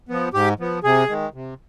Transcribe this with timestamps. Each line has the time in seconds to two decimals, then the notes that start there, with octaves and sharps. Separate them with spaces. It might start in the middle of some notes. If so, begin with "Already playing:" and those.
0.09 F3 B3
0.34 G#2 G4
0.59 F3 B3
0.83 C3 G#4
1.09 D#3 G#3
1.34 C3